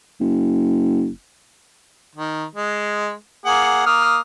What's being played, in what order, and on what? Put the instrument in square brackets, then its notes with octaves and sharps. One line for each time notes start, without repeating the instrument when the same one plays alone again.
[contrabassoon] F#1
[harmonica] D#3
G#3
A#3 G#4 F#5
A#3 D#6 F6